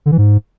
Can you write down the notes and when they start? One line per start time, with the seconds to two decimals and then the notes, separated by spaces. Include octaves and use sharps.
0.06 D3
0.12 E3
0.18 G#2